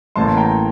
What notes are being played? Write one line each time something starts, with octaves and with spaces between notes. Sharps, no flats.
A1 A2 E3 A#3 A5 C6
G5 A#5